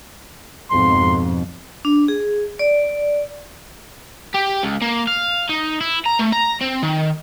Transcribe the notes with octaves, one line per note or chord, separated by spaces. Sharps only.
F2 G#2 B2 C6
D4
G#4
D5
G4
C#2
A#3
F5
D#4
E4
A#5
A3
A#5
C4
D#3